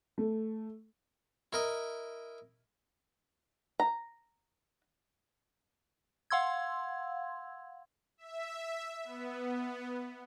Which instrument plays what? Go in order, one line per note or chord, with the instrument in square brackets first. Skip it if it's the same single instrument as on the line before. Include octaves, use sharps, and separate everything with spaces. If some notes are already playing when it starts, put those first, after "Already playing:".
[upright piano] A3
[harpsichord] E4 A#4 D#5
[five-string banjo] A#5
[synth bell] F5 F#5 C6 E6 G#6
[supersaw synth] E5
B3